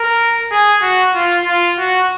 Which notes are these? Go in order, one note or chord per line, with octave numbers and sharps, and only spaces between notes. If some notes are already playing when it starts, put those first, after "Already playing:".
Already playing: A#4
G#4
F#4
F4
F4
F#4